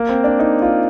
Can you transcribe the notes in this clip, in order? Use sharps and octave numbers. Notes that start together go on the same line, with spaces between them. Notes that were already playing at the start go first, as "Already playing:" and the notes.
Already playing: A#3
C4
D4
D#4
F4